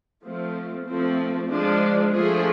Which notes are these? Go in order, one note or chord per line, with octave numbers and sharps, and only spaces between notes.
F3 A3 C4
F3 A3 C4
F3 G#3 D4
F3 A3 D4 G#4